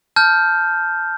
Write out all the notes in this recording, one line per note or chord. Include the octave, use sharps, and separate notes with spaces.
A5 F6 G6